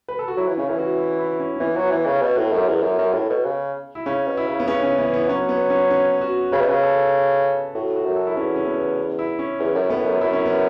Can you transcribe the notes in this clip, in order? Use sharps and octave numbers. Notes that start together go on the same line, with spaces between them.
B4
A4
F#4
F#3 E4
E3
C#3 C#4
E3
F#4
E4
E4
C#4
C#4
E3 B3
F#3
E3
C#3
B2
A2
F#2
E2
F#2
F#2
A2
B2
C#3
E4
C#3 C#4
B2
E4
C#3
B3
C#3 C#4
C#4
E3 B3
B3
F#3 C#4
B3
C#4
C#4
F#4
C#3 B4
B2
C#3
A4
A2 F#4
F#4
F#2
A4
E4
E2 C#4
C#4
B3
E4
C#4
E2
F#2
A2 B3
F#2
F#2 E4
C#4
B3